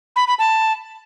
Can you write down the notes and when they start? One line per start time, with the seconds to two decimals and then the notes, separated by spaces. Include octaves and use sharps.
0.16 B5
0.27 B5
0.39 A5